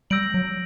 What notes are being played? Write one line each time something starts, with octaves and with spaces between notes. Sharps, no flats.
G3 E6 G6 A#6 D7 F#7
F#3